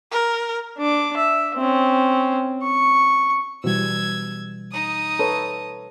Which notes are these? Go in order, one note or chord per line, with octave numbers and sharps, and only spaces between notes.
A#4
D4 D6
E5
C4 C#4
C#6
B2 E3 G3 E6 G#6
D#4 D#6
A4 B4 C#5